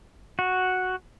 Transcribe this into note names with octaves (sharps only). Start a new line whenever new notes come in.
F#4